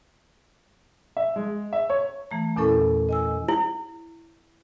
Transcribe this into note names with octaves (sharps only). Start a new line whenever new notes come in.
E5
G#3
E5
C#5
E3 A3 A#5
E2 A#2 C#4 E4 A4 C#6
D#5 G#5 E6
E4